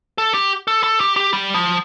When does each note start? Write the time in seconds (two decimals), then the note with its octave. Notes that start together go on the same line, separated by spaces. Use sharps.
0.18 A4
0.34 G4
0.68 A4
0.84 A4
1.00 G4
1.16 G4
1.33 G3
1.54 F3